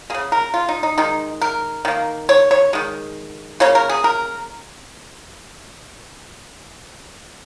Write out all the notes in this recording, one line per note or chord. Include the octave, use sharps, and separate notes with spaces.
C#3 A#3 G#4
A#4
F4
D#4
D#4
D#3 G#3 D#4
A#4
D#3 A#3
C#5
C#5
D#3 G#3
C#3 A#3 C#5
A#4
G#4
A#4